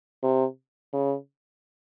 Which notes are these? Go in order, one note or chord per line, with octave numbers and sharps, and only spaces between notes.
C3
C#3